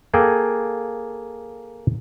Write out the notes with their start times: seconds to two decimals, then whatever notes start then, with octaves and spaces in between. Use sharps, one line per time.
0.14 A#3 G#4 A4 G5